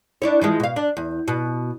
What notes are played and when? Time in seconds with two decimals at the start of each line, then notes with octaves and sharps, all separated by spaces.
0.22 D4 E4 C#5
0.41 E3 F3 G#3
0.60 B2 F5
0.76 D4
0.97 E2
1.28 B2